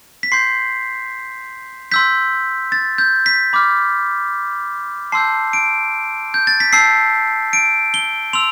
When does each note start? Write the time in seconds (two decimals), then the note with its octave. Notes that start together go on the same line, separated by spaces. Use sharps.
0.23 B6
0.32 C6 G6 C7
1.92 C6 E6 G6 B6
2.72 A6
2.98 G6
3.26 B6
3.53 B5 D6 F6
5.12 A5 C6 E6 G6 C7
5.53 D7
6.34 G6
6.47 A6
6.60 B6
6.73 A5 E6 G6 C7
7.53 D7
7.94 G7
8.33 C6 E6 F7